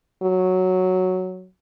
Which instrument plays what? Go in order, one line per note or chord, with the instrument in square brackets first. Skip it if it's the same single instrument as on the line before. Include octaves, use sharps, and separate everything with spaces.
[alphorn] F#3